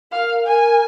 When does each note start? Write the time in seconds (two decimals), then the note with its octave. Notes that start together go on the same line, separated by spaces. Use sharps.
0.12 A#4 F5
0.45 A#4 G#5